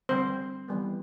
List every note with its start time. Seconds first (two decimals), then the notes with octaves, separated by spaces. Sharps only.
0.09 D3 G3 C4 C5
0.68 E3 G3 B3